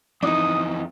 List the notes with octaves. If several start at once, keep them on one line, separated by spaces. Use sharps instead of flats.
F2 E3 D4 D#4 D#6